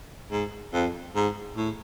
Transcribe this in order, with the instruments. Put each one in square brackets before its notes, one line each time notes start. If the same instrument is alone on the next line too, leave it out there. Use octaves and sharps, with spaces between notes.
[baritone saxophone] G#2
F2
G#2
A2